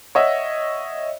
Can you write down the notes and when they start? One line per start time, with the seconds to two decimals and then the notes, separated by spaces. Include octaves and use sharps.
0.15 C#5 D#5 E5 F#5